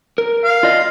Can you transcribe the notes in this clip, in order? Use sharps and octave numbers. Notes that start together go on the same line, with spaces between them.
A#4
F5
F4 D5 D#5